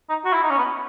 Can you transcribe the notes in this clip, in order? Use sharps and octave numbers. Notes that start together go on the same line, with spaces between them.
D#4
F#4
E4
D#4
C#4
B3